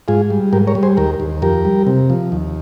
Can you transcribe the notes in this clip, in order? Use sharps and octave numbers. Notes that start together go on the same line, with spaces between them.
G#2 F4 G#4
G3
G#2 G4 A#4
A#4 C#5
G3
G#4 C5
D#2 G4 A#4
D#2
F2 G4 A#4
G3
C3
F3
D#2